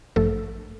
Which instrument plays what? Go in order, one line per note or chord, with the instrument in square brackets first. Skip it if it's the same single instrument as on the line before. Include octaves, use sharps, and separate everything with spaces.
[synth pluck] A1 G2 F3 A3 A4